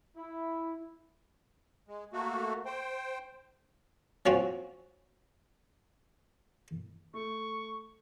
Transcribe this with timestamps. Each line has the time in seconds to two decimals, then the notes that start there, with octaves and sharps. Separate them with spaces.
0.17 E4
1.88 G#3
2.13 A3 A#3 F#4
2.66 C5 G5
4.26 F3 F#3 C4 C#4 F#4
7.14 A3 C#6